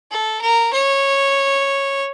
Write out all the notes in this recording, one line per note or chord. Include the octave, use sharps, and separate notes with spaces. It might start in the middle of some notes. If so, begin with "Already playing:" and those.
A4
A#4
C#5